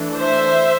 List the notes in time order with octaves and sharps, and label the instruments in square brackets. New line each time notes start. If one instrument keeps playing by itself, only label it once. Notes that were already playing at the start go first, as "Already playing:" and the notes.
Already playing: [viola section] E3 A3 D4
C5 E5